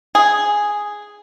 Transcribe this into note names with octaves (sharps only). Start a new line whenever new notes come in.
G#4